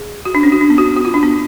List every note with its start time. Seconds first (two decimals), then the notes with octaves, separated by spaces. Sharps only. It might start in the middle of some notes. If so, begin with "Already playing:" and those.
Already playing: G#4
0.25 F#4
0.35 D4
0.43 C#4
0.52 F#4
0.61 D4
0.70 B3
0.78 F#4
0.97 F#4
1.05 F4
1.14 D4
1.23 B3